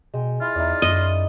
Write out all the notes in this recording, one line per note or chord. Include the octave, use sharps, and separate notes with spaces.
B2 G#3 G5
E4 F4
E2 D#4 E4 D5
F#2 D#5